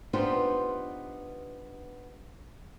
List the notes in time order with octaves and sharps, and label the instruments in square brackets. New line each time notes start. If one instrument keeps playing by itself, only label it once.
[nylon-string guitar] B3 D4 D#4 F4 G4 C5